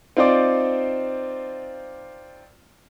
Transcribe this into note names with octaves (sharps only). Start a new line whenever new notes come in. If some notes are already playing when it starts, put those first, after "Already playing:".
C4 D#4 F4 C5 D5 D6